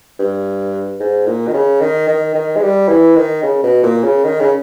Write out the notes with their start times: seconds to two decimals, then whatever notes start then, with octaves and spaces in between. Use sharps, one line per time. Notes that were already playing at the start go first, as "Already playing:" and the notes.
0.20 G2
1.00 G#2
1.27 A#2
1.48 D#3
1.54 C#3
1.81 D#3
2.08 D#3
2.35 D#3
2.56 G#3
2.63 G3
2.89 E3
3.16 D#3
3.43 C#3
3.63 B2
3.83 A#2
4.04 C#3
4.24 D#3
4.40 C#3